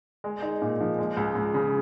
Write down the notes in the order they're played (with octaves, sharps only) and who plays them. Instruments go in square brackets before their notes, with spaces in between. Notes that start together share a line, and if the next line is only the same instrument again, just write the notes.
[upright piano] G#3
D#4
A#2
F3
G#3
C#2
C#2
C#3